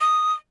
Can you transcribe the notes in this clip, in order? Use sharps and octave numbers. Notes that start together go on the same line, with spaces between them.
D#6